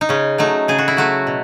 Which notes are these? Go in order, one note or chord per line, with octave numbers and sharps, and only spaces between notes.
D#4
C#3 C#4
F#3 A3 D#4
C#3 G#4
F#4
E4
F#3 A3 F#4
B2